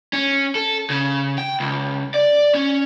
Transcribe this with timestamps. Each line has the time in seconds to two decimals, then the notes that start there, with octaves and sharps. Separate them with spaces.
0.13 C#4
0.55 A4
0.90 C#3
1.38 G5
1.60 C#2
2.14 D5
2.55 C#4